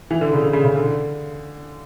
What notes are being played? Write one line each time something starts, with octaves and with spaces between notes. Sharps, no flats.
E3
D3
C#3
D3
C#3
C#3
D3